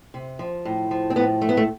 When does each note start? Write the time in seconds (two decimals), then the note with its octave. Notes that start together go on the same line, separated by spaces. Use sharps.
0.14 C3
0.39 F3
0.65 A2
0.91 F3
1.10 C4
1.16 A2 B3
1.41 F3 A3
1.49 B3
1.57 A3